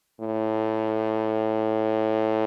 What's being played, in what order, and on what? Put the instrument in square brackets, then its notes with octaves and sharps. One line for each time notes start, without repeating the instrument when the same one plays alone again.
[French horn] A2